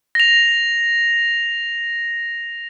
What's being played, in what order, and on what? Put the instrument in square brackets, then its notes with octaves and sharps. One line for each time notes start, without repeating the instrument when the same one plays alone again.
[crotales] A#6 F7